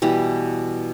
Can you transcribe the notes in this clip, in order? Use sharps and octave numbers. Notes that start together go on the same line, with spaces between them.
B2 E3 G3 G4